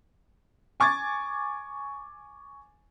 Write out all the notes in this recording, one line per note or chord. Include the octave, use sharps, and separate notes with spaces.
G#5 C#6 D6 G#6 A6